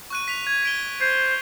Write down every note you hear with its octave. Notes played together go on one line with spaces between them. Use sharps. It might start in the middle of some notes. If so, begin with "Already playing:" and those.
C#6 F#6 D#7
B6 F7
G#6
B6 D7 G7
C5 G#6